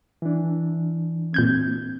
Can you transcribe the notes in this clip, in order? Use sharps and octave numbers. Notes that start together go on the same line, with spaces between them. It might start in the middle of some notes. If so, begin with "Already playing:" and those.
E3 D4
A#2 C4 G6 G#6